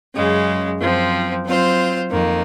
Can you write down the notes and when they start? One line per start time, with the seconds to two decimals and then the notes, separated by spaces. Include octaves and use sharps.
0.15 F#2 C#3 G#3
0.79 F#2 F3 C4
1.45 F#3 C4 F4 C5
2.10 F2 D#3 A#3